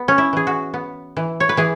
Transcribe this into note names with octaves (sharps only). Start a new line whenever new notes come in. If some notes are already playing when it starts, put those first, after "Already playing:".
Already playing: B3
C#4
E4
E3 G#4
F#4
B3
E3
C#5
B4
E3 G#4